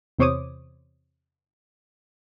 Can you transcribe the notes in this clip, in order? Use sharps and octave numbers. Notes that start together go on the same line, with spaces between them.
E2 C3 C5 C#5 D6 D#6